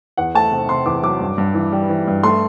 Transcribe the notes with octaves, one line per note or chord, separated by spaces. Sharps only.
E2 F#5
A3 A5
C3
C3 C6
E2 D6
F#3 D6
G2
G2
E3
G3
E3
G2
A3 C6